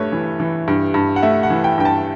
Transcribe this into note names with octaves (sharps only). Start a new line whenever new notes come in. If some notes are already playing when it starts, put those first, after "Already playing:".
Already playing: G2 A3 B4 C#5
E3
E3
G2
G2
F#5
A3 E5
F#5
E3
G5
G2 G5
A5